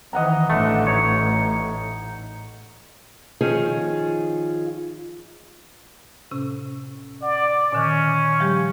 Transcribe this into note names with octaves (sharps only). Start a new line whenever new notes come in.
D#3 E3 D#5 F#5 A#5
A1 A2 D3 A3
D#4 C#5
D#3 F3 C#4 F4 G#4
A2 C3 C#4
D5 F#5
A#2 D3 D#3 C#4
F3 G3 G4